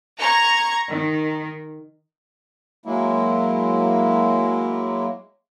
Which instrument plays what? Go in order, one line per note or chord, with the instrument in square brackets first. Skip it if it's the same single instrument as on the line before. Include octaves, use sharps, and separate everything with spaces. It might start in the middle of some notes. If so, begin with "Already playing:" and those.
[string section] A#5 C#6 G#6
D#3
[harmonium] F#3 G#3 A#3 E4